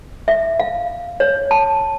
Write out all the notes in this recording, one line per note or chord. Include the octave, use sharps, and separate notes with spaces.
E5
F5
C#5
A5